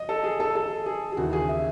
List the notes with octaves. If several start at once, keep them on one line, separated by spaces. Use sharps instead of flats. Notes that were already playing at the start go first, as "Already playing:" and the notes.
Already playing: D#5
A4
G#4
A4
A4
G#4
G#4
D#2 C#3 E3 F#4
G#4
E5